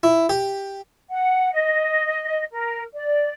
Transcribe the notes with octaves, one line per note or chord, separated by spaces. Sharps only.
E4
G4
F#5
D#5
A#4
D5